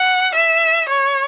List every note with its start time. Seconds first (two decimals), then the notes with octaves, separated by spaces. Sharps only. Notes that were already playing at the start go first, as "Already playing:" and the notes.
Already playing: F#5
0.35 E5
0.89 C#5